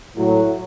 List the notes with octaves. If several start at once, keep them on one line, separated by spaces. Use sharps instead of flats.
A2 F#3